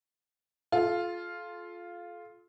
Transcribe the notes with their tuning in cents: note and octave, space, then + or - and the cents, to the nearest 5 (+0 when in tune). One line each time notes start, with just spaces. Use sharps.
F4 +0 A4 -35